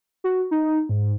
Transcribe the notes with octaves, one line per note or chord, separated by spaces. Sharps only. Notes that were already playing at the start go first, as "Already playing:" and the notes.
F#4
D#4
G#2